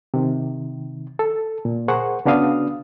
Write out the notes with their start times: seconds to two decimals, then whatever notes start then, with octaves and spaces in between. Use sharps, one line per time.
0.14 C3 D#3
1.19 A4
1.65 A#2
1.88 G#4 A#4 C5 F#5 C#6
2.25 C#3 B3 D4 F#4 F5 D#6